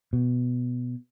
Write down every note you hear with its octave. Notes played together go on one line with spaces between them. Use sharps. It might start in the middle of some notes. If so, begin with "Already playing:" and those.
B2